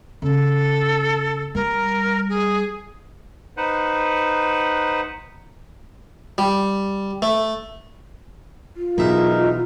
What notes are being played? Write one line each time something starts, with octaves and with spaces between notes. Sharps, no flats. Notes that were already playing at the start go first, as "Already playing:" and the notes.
C#3 A4
G3 A#4
G#4
D#4 B4 C5 F#5
G3
A3
F4
B2 E3 F#3 D#4 G#4 A#4 E5